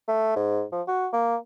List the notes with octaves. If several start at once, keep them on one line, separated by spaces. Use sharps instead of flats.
A3
G#2
F3
F#4
A#3